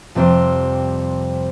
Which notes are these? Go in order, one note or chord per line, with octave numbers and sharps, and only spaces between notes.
F2 C3 G3 C4